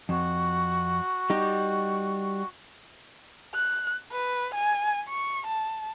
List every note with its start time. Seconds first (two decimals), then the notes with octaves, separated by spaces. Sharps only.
0.09 F2 F#4
1.30 G3 D#4 G4
3.54 F#6
4.12 B4
4.54 G#5
5.09 C#6
5.47 A5